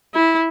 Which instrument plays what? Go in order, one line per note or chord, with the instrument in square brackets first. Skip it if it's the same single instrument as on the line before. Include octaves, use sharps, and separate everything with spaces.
[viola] E4